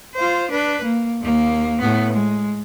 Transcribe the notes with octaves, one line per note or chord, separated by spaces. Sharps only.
F4 C5
D4 B4
A#3
D#2 A#3
A2 B3
G#3